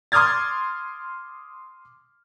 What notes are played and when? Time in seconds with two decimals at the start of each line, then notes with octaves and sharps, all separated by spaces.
0.12 C6 D6 D#6 F6 G#6 A6